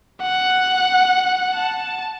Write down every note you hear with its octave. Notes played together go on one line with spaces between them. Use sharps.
F#5
A5